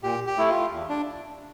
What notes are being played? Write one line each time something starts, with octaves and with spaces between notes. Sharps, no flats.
A#2 G4
G4
A3 E4
F4
E2
D4